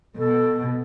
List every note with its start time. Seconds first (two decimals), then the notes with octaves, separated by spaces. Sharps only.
0.16 B2 A4